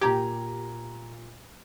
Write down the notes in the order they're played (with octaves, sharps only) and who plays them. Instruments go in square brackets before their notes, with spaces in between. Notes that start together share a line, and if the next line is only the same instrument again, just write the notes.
[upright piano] A#2 A#5 G#6 [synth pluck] G4